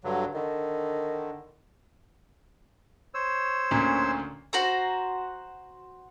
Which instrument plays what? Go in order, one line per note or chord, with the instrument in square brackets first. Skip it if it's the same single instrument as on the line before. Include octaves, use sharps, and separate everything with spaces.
[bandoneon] G2 D3 F#3
[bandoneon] D3 [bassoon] D#3
[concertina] C5 C#5 E6
[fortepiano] D2 A#2 C#4
[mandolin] F#4 C5 A#5